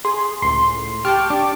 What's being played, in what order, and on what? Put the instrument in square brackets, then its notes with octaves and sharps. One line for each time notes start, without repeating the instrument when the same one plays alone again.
[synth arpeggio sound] G#4 [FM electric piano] C6
[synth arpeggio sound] C#2 A2 [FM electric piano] C6
[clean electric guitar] G4 [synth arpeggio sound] G5 A5 C#6 [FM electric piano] F6
[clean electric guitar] D4 [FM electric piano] D6